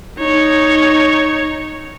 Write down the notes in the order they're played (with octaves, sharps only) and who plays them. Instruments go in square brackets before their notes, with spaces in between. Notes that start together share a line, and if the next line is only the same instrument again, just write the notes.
[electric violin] D#4 C#5